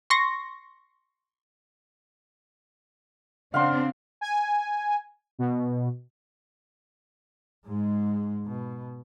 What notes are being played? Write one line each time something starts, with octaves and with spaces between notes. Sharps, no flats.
C6 C#6 A#6
C#3 C4 D4 F5 F#5 C6
G#5
B2
G#2 G#3
B2